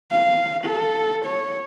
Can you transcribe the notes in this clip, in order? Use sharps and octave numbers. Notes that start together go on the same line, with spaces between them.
F5
A4
C#5